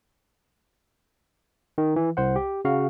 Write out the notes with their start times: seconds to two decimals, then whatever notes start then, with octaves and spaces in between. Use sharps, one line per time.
1.78 D#3
1.96 E3
2.17 C2 C5 F#5
2.36 G4
2.65 C#3 F#4 F5